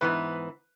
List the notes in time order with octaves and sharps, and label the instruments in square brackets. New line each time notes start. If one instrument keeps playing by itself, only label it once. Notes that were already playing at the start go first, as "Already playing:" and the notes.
[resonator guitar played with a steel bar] G#2 E3 B3 [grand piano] B4